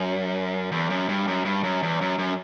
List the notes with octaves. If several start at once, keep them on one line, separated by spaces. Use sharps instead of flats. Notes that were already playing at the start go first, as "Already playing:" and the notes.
Already playing: F#2
E2
F#2
G2
F#2
G2
F#2
E2
F#2
F#2